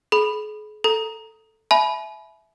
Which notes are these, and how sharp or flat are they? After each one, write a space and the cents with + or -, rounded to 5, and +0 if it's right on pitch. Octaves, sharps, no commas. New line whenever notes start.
G#4 +40 B5 +0
A4 +0 A#5 +0
E5 +0 G#5 +40 B5 +0